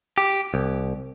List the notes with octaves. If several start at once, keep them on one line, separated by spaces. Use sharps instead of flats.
G4
C2